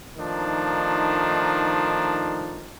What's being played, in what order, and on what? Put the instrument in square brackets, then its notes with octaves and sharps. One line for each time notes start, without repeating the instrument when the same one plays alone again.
[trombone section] D#3 F3 A3 D4 D#4